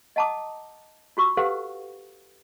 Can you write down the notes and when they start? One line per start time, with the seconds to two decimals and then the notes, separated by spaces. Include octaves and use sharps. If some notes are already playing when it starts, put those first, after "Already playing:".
0.16 D#5 F#5 A5 A#5 D6 D#6
1.17 F4 F#4 C#6 E6
1.37 G4 A4 B4 C5 F5 F#5